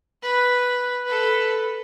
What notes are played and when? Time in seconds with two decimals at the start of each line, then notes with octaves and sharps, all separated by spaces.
0.22 B4
1.05 A4 B4